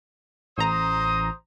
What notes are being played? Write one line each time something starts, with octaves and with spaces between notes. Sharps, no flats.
A1 C5 A#5 D#6